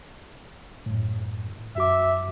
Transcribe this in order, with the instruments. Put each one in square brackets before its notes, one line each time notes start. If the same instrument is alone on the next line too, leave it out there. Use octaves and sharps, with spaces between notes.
[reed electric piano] F#2 A2
[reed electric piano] F#2 F#4 D6 [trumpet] E5